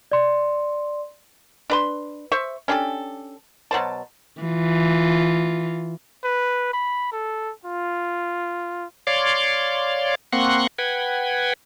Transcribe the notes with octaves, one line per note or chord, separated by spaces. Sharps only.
D5 C6
D4 B4 C6
C5 E5 C#6
C#4 D4 G4 A4
B2 F#3 C5 A5
E3 F4
B4
B5
A4
F4
C#5 D5 F5 C6 D6
A#3 C4 F#5 C6 C#6 F#6
B4 F#5 G5 G#6